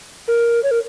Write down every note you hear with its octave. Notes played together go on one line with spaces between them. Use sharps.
A#4
C#5
A#4